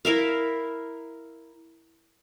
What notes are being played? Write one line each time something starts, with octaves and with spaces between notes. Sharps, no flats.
E4 A#4 E5 F5